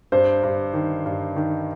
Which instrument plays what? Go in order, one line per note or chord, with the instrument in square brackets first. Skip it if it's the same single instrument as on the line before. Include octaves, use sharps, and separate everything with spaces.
[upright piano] G2 [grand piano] C5
[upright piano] G2
D#3
G2
D#3